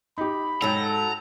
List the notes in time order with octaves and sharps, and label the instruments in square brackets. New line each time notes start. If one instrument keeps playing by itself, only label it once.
[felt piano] D#4 G4 [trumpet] B5
[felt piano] G#2 G5 G6 [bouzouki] F#3 A4 [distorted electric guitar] A#5